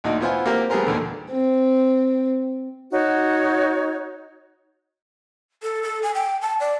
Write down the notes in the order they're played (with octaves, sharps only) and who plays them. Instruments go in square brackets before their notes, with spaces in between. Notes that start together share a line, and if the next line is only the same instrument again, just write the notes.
[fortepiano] D2 A#2 D#4 F#4
B3 E4 F4 C5 F#5 G#5
A#3 C4 G4 A#4 C5
G3 A3 B3 G#4 A#4 C5
D#2 A#2 D3
[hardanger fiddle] C4
[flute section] D#4 F#4 C#5
[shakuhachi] A4
A4
G#5
G5
A5
D5